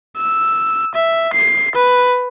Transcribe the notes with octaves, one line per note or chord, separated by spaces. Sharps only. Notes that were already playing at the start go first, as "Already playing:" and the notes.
E6
E5
C7
B4